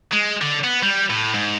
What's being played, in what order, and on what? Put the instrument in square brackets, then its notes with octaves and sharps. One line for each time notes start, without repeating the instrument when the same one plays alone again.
[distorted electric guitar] G#3
D3
B3
G3
A2
G#2